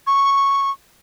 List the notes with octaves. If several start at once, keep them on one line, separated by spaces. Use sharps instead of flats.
C#6